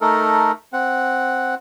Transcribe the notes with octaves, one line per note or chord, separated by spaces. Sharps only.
A3 D#4 A4 A#4
C4 F#5